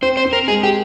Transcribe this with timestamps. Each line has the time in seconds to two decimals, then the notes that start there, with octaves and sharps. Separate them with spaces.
0.02 C4 C5
0.17 C5
0.25 C4
0.33 A#4
0.48 G#3 G#4
0.63 G4